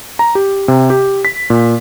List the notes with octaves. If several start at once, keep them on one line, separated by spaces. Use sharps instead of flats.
A#5
G4
C3
G4
B6
A#2